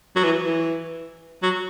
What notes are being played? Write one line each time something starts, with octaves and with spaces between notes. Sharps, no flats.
F#3
E3
E3
F#3